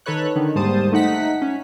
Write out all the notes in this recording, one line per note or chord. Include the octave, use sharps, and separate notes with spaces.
D#3 A4 B4 C#5 F#6
D3 D#3
D#2 G#2 G3 C5 A5 D#6
A3 D#4 F#5 B6
C#4